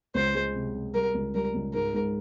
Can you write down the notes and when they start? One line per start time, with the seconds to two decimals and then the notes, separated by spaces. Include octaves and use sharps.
0.15 C#2 C5
0.35 G#3
0.55 C3
0.75 C3
0.94 G3 A#4
1.15 C#2
1.35 G3 A#4
1.54 C#2
1.74 G#2 A#4
1.94 G#2